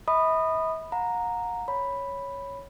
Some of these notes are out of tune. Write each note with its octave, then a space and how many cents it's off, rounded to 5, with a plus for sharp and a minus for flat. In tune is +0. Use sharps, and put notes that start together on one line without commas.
E5 -45 B5 +0 D#6 -20
F#5 -40 A#5 +0
C#5 +0 B5 +0